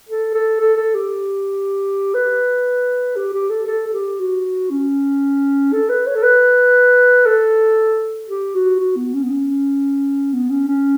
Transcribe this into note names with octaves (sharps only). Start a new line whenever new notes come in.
A4
A4
A4
A4
G4
B4
G4
G4
A4
A4
A4
G4
F#4
C#4
A4
B4
C#5
A4
B4
A4
G4
F#4
F#4
B3
C#4
B3
C#4
B3
C#4
C#4